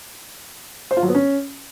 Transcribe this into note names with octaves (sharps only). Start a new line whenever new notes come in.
C5
F4
F#3
B3
C#4